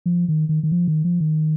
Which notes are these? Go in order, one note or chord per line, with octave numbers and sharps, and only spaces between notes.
F3
D#3
D#3
D#3
F3
D#3
F3
D#3